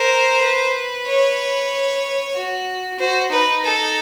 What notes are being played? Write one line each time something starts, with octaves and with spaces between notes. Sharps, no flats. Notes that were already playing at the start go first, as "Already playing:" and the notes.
Already playing: A#4 C5
B4
C#5
F#4
F#4 C5
D#4 B4
A4